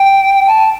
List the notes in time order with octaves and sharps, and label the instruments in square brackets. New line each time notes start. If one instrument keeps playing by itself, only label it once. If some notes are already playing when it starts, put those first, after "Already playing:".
Already playing: [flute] G5
A5